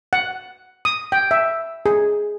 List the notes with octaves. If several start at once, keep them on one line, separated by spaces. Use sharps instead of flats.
F#5
D#6
G5
E5
G#4